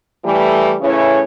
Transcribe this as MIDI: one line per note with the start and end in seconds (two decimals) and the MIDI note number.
0.25 0.74 52
0.25 0.74 55
0.25 0.74 57
0.81 1.21 45
0.81 1.21 49
0.81 1.21 52
0.81 1.21 61
0.81 1.21 64
0.81 1.21 73